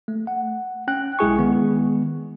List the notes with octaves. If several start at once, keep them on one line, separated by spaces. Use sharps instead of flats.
A3
F#5
C#4 G5 F#6
B1 G#3 E4 G#4 G#5 C#6
D#3 G#3 B3